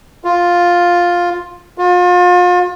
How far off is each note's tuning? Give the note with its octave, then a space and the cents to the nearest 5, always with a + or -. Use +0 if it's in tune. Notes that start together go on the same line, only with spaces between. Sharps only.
F4 +5
F4 +35